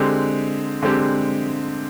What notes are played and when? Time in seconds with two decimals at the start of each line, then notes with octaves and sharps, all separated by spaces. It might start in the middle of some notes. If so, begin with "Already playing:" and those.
Already playing: D3 G#3 C4 G4
0.83 D3 G#3 C4 G4